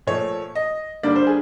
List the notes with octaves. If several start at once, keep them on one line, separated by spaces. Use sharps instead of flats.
A#2 F3 A3 C#5
D#5
D3 G3 A#3 D4 D5
C5
G#4